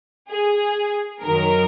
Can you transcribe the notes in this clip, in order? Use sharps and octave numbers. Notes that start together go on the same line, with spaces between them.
G#4
F#2 D#3 F#3 A#4